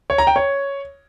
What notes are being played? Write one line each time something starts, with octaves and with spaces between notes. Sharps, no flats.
C#5
A#5
G5
C#5